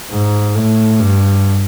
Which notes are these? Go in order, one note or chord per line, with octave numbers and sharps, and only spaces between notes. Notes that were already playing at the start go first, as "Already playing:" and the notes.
G#2
A2
G2